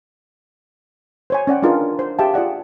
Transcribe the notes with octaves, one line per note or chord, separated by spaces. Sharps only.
C5 C#5 G#5
C#4 D5 F#5 G5
D4 D#4 F4 G#4 A#4 B4
C5
G4 G#4 E5 F5 G5 A5
F4 G#4 D5 F#5